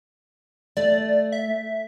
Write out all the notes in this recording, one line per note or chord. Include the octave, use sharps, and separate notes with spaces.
A3 D5
E5